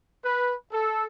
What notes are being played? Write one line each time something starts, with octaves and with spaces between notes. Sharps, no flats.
B4
A4